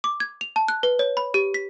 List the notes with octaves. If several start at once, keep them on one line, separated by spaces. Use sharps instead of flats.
D6
G#6
F7
A5
F#6
B4
C#5
B5
G4
B6